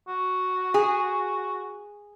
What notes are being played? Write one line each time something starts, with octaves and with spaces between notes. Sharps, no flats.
F#4
G#4